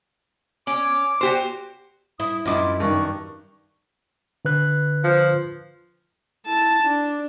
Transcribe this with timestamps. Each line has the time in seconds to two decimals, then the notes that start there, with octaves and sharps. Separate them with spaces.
0.67 C#4 D6
1.21 F#4 G4 C5
2.20 E4 D#6
2.46 F#2 E4 F4 D#5 D6
2.80 G2 D#3 C#6
4.45 D3 B4 F#6
5.04 F3
6.46 E4 A5
6.83 D4